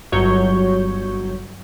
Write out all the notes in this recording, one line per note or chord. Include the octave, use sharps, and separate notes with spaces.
G1 F#3 C#5 C#6 G6